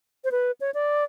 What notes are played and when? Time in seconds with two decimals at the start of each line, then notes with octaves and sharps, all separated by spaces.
0.24 C5
0.32 B4
0.61 C#5
0.74 D5